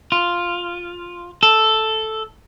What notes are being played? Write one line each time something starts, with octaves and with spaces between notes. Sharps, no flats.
F4
A4